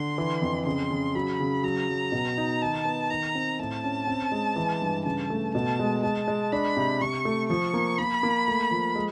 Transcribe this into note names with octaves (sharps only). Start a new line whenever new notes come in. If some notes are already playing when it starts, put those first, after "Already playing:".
Already playing: D3 C6
E3
F2
C#3 C6
C#3
F#3 B5
C#3
F#3 A#5
F#3
B2
D#4
D#3 A5
B3
D#3 A#5
C4
A2 A5
C#4
C4
G#3
E3
G2
C#3 A5
A3
B2 A5
G#3
G#3 A5
G#3
D4 B5
C3
C3 C#6
A3
F3 C#6
A#3
A#3 B5
A#3
A3
F3
G#3